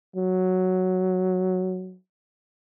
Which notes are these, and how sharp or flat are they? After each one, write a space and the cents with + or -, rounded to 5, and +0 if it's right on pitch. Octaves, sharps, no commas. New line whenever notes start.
F#3 +0